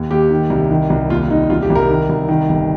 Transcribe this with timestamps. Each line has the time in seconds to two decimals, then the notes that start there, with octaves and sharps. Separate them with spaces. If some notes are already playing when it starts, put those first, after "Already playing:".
Already playing: D#2
0.11 D#2 G4
0.30 D#3
0.50 C2
0.71 D#3
0.90 C2
1.10 D#2 F4
1.29 D#2 D#4
1.50 C2 F4
1.62 G4
1.70 C2
1.75 A#4
1.90 D#3
2.09 C2
2.29 D#3
2.49 G1